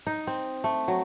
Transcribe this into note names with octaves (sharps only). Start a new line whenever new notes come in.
D#4
C4
A3
F#3